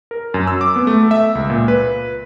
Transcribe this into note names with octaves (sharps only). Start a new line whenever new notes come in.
A#4
F#2
E6
D6
B3
A3
E5
C#2
A#2
B4